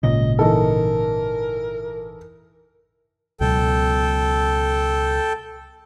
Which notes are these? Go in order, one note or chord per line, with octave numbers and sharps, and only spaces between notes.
G#1 A#2 C#3 D#5
E3 D#4 A4 A#4
C#2 B2 F#3 A4 G5